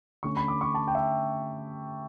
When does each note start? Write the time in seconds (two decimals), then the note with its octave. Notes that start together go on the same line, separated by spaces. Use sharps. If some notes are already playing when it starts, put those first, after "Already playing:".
0.23 D3 A3 C#4 C#6
0.37 B5
0.48 D6
0.61 C#6
0.74 A5
0.87 G5
0.95 E5